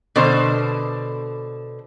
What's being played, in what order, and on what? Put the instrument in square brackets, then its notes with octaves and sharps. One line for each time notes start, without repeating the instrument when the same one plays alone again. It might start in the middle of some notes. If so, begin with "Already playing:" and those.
[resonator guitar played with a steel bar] B2 D3 C5